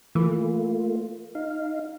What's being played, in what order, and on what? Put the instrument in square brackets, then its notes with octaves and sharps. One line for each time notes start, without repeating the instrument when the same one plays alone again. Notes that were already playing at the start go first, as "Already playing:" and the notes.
[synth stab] E3 [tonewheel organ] A3 A#3 F4
[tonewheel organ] D#4 F5